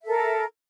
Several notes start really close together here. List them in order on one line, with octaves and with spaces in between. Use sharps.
E5 A4 A#4